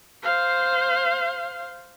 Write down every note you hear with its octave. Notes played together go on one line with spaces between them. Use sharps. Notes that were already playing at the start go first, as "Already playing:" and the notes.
C5 F5